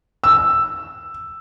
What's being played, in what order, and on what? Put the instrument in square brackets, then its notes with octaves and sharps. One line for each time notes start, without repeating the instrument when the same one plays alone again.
[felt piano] E6